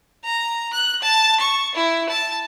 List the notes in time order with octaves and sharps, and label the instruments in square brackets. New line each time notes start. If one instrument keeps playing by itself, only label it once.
[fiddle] A#5
F#6
A5
C#6
E4
A5